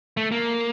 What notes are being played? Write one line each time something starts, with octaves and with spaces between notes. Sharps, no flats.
A3
A#3